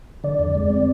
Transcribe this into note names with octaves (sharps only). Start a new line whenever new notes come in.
D3 D5
F2
G#3
C4